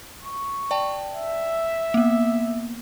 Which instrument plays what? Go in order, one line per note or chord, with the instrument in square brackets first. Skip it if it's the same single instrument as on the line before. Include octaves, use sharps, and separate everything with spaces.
[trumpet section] C#6
[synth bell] D5 G5 A5
[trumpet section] E5
[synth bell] A#3 B3